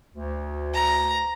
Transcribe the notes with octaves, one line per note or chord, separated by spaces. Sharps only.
D2
A#5